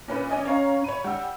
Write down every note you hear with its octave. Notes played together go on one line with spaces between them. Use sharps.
A#2 C#4 B4
C#4 D5 D#5 G#5
C#4 C#5 F5 A#5
C#5 B5 D#7
G3 F#5 E6